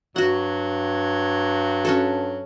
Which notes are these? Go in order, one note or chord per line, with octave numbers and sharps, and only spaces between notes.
G2 F#3 F#4 F#5
C#4 F#4 A4